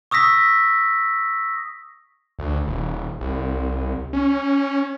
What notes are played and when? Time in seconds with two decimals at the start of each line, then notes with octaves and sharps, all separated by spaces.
0.11 C#6 D#6 E6 A#6 B6
2.39 D2
2.67 D#1
3.20 C2
4.13 C#4